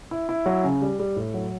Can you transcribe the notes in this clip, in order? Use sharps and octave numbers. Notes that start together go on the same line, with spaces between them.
E4
E4
F#3
C#3
G3
G3
A2
F#3